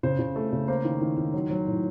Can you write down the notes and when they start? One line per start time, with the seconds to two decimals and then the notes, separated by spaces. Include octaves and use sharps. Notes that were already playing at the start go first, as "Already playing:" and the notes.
0.03 C#3 C5
0.19 C#3
0.36 A3
0.52 C#3
0.68 A#3 C5
0.85 D#3
1.01 D#3
1.17 D#3
1.34 F#3
1.50 F#3
1.67 A2